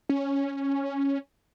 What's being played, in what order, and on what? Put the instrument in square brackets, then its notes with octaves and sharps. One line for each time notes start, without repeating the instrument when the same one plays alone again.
[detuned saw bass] C#4